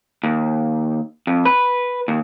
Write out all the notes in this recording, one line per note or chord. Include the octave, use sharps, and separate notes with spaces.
D#2
F2
B4
D#2